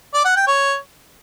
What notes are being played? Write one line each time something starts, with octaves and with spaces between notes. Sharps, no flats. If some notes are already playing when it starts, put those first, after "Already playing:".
D5
F#5
G5
C#5